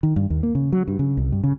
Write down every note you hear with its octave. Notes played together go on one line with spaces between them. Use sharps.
D#3
G2
D#2
A#3
C#3
F#3
G2
C#3
C2
G2
C#3